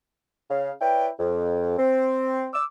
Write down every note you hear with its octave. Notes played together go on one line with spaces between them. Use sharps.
C#3 F5
E4 B4 C#5 D5 G5
F2
C4
D6 E6